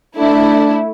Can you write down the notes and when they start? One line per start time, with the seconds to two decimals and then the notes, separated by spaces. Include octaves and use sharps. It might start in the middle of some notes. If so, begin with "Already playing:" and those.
0.17 A3 D4 E4